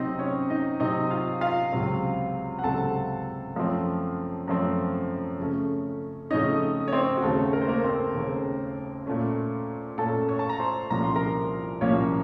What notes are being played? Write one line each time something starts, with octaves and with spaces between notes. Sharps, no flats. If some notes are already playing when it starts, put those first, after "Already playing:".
Already playing: C3 F#3 C4 D#4 D#5
C#4 C#5
D#4 D#5
C3 F#3 C4 D#4 D#5
F4 F5
F4 F5
C#2 C3 F#3 C4
F#5
C#2 C3 F#3 C4 A4 A5
F#2 F3 A3 C4
F#2 F3 A3 C4
F2 C#3 A3 C#4
F2 C#3 A3 C#4 D#4 D#5
C#5
C4 C5
F#4
D#2 C#3 A3 A4
A#4
C5
A#3 A#4
C4 C5
D#2 C#3 A3
A#2 A3 C#4
A#2 A3 C#4 A4 A5
C#5 C#6
A5
A#5
C5 C6
C2 A#2 F3 A#3 C#4 A#5
C6
A#4 A#5
C2 A#2 F3 A#3 C#4 C#5